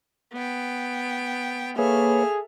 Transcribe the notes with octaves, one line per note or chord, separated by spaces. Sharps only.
B3 G5
A#3 G#4 A4 B4 C#5 E5 F6